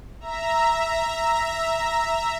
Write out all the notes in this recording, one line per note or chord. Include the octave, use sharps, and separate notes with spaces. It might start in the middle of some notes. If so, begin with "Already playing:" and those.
E5 A#5